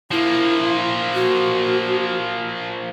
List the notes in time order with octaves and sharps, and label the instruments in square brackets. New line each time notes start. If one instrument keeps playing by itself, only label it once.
[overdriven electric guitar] F3 A#3 [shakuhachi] E4
[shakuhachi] F#4